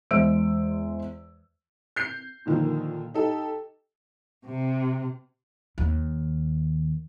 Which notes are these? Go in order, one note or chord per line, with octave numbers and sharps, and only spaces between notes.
E2 G#3 C5 E5 E6 D7
G6 C7
A#2 D3 D#3 F3 A#3
D#4 G4 A4
C3
D#2